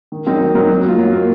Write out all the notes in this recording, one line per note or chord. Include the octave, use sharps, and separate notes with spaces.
D#3
F#3 C4 D#4 A#4
D#3
F#3 C4 D#4 A#4
F#3
A#3 F4
F#3
A#3 F4